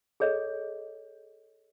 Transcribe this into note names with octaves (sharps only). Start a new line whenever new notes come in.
G#4 A4 C#5 D#5